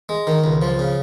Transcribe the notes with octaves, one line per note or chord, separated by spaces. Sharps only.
G#3
D#3
C#2
F3
C#3